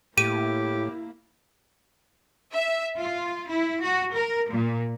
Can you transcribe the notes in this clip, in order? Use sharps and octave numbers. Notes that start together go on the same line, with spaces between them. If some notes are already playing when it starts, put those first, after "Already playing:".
A2 A#3 E4 G4 D#7
E5
F4
E4
F#4
A#4
A#2